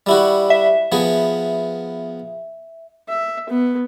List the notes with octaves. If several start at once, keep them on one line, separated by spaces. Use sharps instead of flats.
G3 E4 F#4
E5
F3 B3 G#4
E5
B3